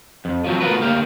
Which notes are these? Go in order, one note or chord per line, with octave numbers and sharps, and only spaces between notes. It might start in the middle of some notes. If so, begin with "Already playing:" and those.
F2
F3 F#3 C4
A3 B3 F4 F#4 A#4 B4
D2 A#3 G4 F5